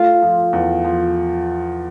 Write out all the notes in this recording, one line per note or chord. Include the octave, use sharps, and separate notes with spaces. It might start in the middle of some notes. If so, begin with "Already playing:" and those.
Already playing: A3 F4 F5
F3
E2
F3